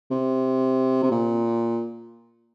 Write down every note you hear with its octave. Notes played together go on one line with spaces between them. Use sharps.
C3
C3
A#2